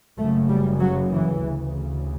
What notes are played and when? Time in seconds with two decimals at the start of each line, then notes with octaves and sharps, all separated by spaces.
0.18 F#1 F#2 C#3 A3
0.48 G3
0.79 F#3
1.10 E3
1.41 D2 C#3